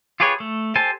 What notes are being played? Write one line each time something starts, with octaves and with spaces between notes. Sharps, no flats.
F4 G4 G#4 B4 C#5
A3
G4 A4 C5 G#5 A5